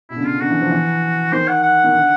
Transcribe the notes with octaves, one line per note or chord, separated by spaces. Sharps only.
B2 E4
D3
C#3 F4
D3 F#4
E3
F3
E3
D#3 C5
F#5
F#5
D#3
D3